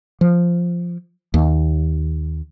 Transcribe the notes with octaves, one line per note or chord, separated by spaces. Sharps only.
F3
D#2